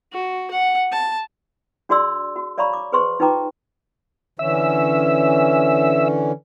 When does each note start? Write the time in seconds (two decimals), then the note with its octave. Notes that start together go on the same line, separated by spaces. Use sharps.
0.12 F#4
0.51 F#5
0.92 A5
1.89 D4 F#4 G#4 D5 C6 E6
2.36 F#4
2.58 C#5 D5 F5 A#5 B5 C#6
2.73 D6
2.93 G#4 B4 C5 C6 C#6
3.20 D#4 F4 B4 G5 A#5 D6
4.39 D3 E3 C#4 E5